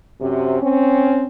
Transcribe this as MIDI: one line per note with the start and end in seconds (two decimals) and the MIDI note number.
0.21 0.61 42
0.21 0.61 48
0.62 1.27 60
0.62 1.27 61